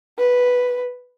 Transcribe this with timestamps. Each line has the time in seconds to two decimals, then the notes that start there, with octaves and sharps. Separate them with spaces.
0.19 B4